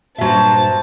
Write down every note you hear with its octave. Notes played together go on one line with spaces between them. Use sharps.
G2 A#2 F#3 C5 E5 A5